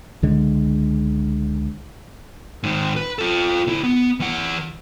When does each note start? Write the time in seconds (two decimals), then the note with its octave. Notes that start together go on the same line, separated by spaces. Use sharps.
0.22 C#2 D3 G#3
2.63 G#2 D#3
2.97 B4
3.19 F4 A4
3.67 D2 E4
3.84 B3
4.20 E3 F#5